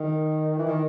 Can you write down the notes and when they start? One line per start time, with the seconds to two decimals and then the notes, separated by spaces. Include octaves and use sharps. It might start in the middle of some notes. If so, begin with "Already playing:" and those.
Already playing: D#3
0.58 E3
0.67 D#3